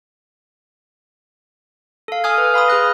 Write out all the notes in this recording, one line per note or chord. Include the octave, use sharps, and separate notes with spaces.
A4 F5
G#5 D#6 F6 G#6
B4
F5 B5 C6 D#6
G#4 F6 F#6 A#6